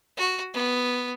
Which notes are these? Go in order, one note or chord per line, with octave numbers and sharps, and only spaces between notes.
F#4
B3